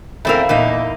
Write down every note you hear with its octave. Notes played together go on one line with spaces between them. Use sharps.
E2 A3 C4 A#4 E5 F5 B5
E2 A#2 A#3 D#4